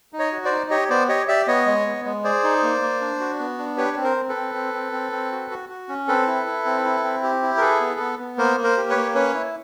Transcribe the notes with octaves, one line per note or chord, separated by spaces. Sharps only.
D#4
C#5 D#5
F#4
C5 D5
D#4
G4 C#5 D#5
B3 C5 D5
G4 C#5 D#5
G4 D5 E5
B3 C#5 D#5
G#3
B3
G#3
G#4 C5 D5
D#4
A#3
A#3
D4
F#4
B3
D4
G4 B4 C#5
C4
A#4 C5
C4
A4 B4
C4
C4
C4
C4
C4
F#4
F#4
F#4
C#4
C4 A4 B4
E4
E4
C4
E4
C4
G4
E4
A#4
G#4 A4 B4
B3
B3
B3
A#3 A#4 C5
A#3
A#4 C5
G4
B4 C#5
A#3
C#4 B4 C#5
E4